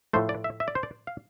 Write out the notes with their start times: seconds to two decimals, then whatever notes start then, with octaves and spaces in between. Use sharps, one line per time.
0.13 A2 F3 A3 C5
0.29 D5
0.44 E5
0.60 E5
0.68 D5
0.75 C5
0.83 D5
1.07 F5